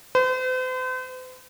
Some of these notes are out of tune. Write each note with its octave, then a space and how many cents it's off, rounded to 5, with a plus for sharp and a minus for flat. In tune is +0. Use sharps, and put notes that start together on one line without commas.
C5 -45